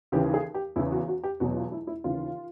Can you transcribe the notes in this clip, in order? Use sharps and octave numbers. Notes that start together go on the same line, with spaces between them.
D#2 C#3 E3 G4
G#4
G4
E2 C#3 E3 E4
F#4
F#4
G4
E2 B2 F#3 F#4
F4
E4
E4
D#2 C#3 E3 F4